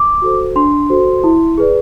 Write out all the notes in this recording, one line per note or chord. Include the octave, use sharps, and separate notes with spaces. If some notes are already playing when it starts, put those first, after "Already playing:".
Already playing: D6
F#4 A4 C5
D4 C6
F#4 A4 C5
E4
G#4 B4 D5